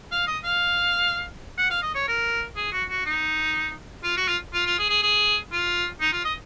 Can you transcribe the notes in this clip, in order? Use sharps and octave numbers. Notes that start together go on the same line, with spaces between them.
F5
D#5
F5
F#5
F5
D#5
C#5
A#4
G#4
F#4
F#4
D#4
F4
F#4
F4
F4
F4
G#4
G#4
G#4
F4
D#4
F4
D#5